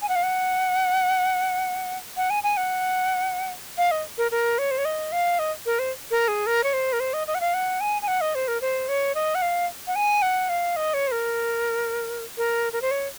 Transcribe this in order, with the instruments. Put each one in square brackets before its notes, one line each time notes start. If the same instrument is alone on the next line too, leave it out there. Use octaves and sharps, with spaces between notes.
[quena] G#5
F#5
F5
F#5
F#5
G#5
G#5
F#5
F5
D#5
A#4
A#4
C#5
C5
C#5
D#5
F5
D#5
A#4
C5
A#4
G#4
A#4
C#5
C5
A#4
C5
D#5
D#5
F#5
F5
F#5
G#5
G#5
F#5
D#5
C5
A#4
C5
C#5
D#5
F#5
F5
F#5
G#5
F#5
F5
D#5
C#5
C5
A#4
A#4
A#4
C5
C#5